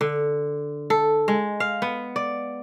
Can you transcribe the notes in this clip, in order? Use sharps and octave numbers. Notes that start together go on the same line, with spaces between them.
D3
A4
G#3
F5
B3
D5